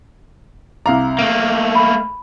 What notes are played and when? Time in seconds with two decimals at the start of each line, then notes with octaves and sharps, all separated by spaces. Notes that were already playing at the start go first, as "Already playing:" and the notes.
0.86 C2 F5 A#5 D6
1.19 A3 A#3 D7
1.75 B5